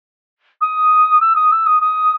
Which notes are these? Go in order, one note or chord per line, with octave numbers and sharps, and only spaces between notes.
D#6
E6
D#6
E6
D#6
D#6